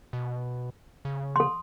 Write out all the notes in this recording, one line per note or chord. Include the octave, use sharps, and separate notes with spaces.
B2
C#3
A4 C6